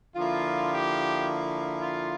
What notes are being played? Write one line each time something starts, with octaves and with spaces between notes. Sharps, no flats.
D3 F3 A#3 E4 F4
G4
F4